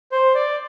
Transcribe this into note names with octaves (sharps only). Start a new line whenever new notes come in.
C5
D5